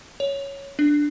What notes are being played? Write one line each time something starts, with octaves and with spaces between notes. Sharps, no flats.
C#5
D4